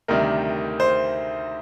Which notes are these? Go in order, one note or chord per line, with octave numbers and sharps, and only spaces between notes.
D2 C3 D#3 G3 A#4
C5